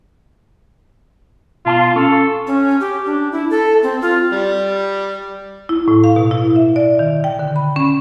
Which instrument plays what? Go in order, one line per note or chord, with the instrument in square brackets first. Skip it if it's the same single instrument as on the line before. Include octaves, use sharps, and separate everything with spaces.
[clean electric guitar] B2 A5 C6 [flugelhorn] F4
[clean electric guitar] C#4 [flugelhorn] A4
[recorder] C#4
G4
D4
E4
A4
C4
F4
[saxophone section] G3
[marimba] E4
A2
F5
B2
E4
E5
D5
D#3
G5
D3
B5
C#4